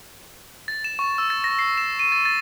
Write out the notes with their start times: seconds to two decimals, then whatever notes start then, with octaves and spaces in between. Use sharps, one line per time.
0.68 A6
0.84 E7
0.99 C#6
1.18 E6
1.30 A6
1.44 A#6
1.59 C7
1.78 E7
1.99 D#7
2.12 A6
2.25 A6